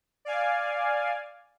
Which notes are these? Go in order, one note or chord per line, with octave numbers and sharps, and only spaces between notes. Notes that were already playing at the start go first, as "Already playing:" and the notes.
D5 F5 G#5